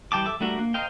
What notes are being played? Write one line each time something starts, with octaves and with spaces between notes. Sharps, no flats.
E3 G3 G5 A5 D6
A4 E5 D6
G3 A3 D4 F#4 A#4
A#3
A#4 C5 D#5 F5 G5